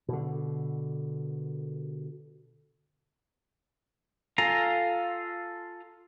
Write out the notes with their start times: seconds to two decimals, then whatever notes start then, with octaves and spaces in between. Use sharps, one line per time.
0.08 B2 D3
4.38 F4 A4 F5 G#5 A#5